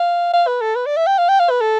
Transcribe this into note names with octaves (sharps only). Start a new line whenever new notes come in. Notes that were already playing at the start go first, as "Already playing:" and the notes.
Already playing: F5
F5
B4
A4
B4
D5
E5
G5
F5
G5
F5
B4
A4